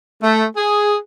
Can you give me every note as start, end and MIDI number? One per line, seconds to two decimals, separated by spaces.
0.22 0.45 57
0.57 0.97 68